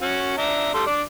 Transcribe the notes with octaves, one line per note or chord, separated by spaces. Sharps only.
C#4 F#4
D4 E5 A#5
G3 A4 C6
D4 D6